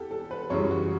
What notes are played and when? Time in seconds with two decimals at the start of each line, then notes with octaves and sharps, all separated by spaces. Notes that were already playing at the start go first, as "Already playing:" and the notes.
Already playing: E2 G4 A4
0.11 A4
0.31 B4
0.50 F#2 C#3 E3 G3 C#5
0.71 F#4